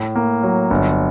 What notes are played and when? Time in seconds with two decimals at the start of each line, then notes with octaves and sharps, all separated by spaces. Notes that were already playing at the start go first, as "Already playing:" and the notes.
Already playing: A2
0.16 A#3
0.43 F#3
0.70 G1